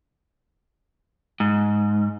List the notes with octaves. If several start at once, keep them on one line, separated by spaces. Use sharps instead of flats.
G#2